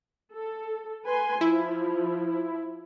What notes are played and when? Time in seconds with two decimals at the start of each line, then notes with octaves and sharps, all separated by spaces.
0.33 A4
1.05 B4 G#5 C6
1.41 F3 E4